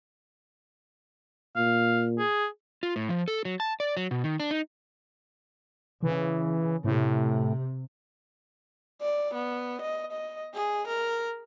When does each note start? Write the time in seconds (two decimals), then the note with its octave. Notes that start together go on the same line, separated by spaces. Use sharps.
1.56 A#2 F5
2.19 G#4
2.83 F4
2.96 A2
3.09 F3
3.28 A4
3.45 F#3
3.60 A5
3.80 D5
3.97 F#3
4.11 B2
4.24 D#3
4.40 D4
4.51 D#4
6.03 C#3 E3
6.84 A2 C3
9.01 D5
9.35 B3
9.82 D#5
10.13 D#5
10.54 G#4
10.88 A#4